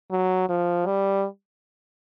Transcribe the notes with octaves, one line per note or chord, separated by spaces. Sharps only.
F#3
F3
G3